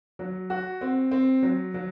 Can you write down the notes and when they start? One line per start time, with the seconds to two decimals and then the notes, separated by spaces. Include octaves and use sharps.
0.19 F#3
0.50 F#4
0.81 C4
1.11 C4
1.43 F#3
1.74 F#3